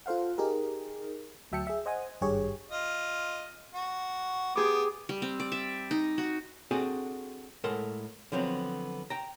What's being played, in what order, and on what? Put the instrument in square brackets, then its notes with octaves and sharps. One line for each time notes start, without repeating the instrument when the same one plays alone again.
[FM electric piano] F4 A4 C5 F5 F#5
D#4 G4 G#4 A#4
D2 F#3 E5 G5 A5 C#7
G#4 E5
C5 D#5 F#5 G#5 D#6
G#1 G2 G4 G#4 C#5
[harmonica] F4 D#5
F#4
[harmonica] B3 [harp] G4 G#4 D6
[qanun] G3
C4
D5
E5
D#4
F#4
[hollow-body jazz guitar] C4 D4 F#4 G#4 A4
A2 G#3 A4 A#4 F#5 C6
D3 F3 F#3 B3 C4
G5 A#5